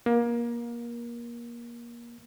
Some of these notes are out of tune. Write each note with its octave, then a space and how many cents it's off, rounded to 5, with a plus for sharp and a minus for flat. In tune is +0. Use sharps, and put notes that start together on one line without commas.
A#3 +25